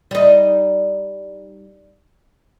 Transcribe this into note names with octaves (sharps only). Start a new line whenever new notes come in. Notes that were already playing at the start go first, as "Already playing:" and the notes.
G3 D#4